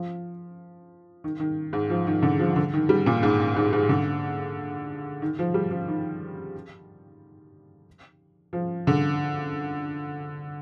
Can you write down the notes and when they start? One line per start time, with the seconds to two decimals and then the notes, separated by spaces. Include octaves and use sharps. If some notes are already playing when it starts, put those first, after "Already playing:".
Already playing: F3
1.24 D#3
1.40 D#3
1.73 G#2
1.90 F3
2.07 D#3
2.22 D3
2.39 F3
2.56 D3
2.73 D#3
2.89 G3
3.06 A#2
3.23 G#2
3.56 G#2
3.73 G#2
3.89 D3
5.22 D#3
5.39 F3
5.54 G3
5.71 F3
5.88 D#3
8.53 F3
8.87 D3